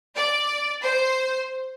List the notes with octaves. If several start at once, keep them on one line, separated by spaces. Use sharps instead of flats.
D5
C5